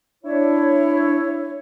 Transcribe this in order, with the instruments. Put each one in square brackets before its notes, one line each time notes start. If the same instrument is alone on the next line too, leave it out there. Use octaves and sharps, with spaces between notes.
[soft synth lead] D4 [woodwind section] E4 C#5